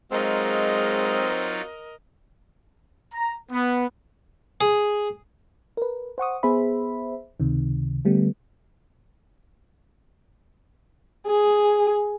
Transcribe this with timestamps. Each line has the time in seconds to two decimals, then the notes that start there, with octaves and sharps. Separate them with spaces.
0.12 F#3 G#3 C4 D#4 F4 A#4 D#5
3.13 A#5
3.51 B3
4.61 G#4
5.77 A#4 B4
6.18 C5 F#5 C#6 D#6
6.43 B3 G#4 C5 E5 B5
7.40 C#2 C3 D#3
8.05 D3 G3 A3 B3
11.26 G#4